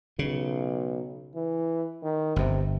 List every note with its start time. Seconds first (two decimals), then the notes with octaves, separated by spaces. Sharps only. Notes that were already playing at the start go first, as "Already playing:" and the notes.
0.19 B1 C#3
1.35 E3
2.03 D#3
2.36 G1 G2 C3